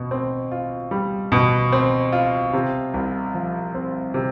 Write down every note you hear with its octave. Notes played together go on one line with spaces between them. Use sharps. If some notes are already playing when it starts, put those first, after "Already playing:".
Already playing: B2
C4
F4
G3
B2
C4
F4
C3
C2
F3
C4
C3